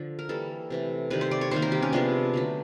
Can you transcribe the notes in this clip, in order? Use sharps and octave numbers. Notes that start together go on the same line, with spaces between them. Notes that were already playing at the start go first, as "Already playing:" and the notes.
Already playing: D3 F3
A#4
E3 G3 A#3 A4
C3 E3 A3
C3 D#3 G3 B4
C5
D5
C#5
C3 D#3 G3 A#3 C5
A#4
G4
C#4
C3 F3 G#3 B3 D4
D3 F#3 A3